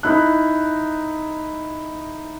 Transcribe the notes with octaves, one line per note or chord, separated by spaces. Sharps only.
D#4 E4 F#6